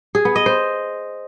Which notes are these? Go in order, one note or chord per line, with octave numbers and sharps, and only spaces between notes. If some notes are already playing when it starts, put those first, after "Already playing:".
G#4
B3
D#5
C5